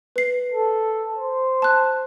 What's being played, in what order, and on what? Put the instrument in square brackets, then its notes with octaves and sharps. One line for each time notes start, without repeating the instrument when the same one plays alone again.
[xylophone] B4 C7
[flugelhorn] A4
C5
[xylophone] A5 F#6